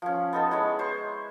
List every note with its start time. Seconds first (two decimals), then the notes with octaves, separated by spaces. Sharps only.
0.02 F3 C#4
0.33 B3 D#4 A4
0.51 G#3 E4 C#5
0.79 C5 C#6